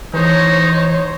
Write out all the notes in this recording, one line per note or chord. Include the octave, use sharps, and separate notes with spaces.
E3 D#4 C5 C#5